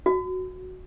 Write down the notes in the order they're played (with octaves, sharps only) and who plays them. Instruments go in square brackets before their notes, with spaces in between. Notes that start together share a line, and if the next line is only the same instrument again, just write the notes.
[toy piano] F#4